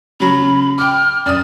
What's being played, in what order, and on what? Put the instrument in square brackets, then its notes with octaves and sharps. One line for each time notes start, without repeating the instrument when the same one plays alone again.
[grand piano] C#3 F#3 [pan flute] B5
[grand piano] C#3
[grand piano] G5 D6 [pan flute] F6
[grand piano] F#2 D#6 [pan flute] D5